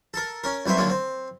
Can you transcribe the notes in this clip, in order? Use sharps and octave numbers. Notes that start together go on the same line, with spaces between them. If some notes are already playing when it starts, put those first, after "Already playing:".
A4 A#4
C#4 A#4
C2 F#3 B4 C5 E5
A#2 D3 D#3 F#3 G#3
C4